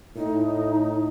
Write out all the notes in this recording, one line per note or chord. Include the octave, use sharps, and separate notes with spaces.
A2 D#4